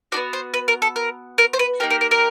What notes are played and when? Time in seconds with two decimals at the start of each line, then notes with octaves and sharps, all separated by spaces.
0.12 B3 D#4 F#4 D5
0.33 C5
0.54 B4
0.68 A#4
0.82 A4
0.96 A#4
1.38 A#4
1.53 C5
1.59 B4
1.80 A#3 D#4 G4 A#4
1.90 A#4
2.01 A#4
2.11 A#4